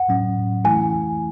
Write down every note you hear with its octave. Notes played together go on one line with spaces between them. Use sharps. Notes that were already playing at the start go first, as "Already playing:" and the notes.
Already playing: F#5
A2 F#3 C#4
E3 A3 E4 G#5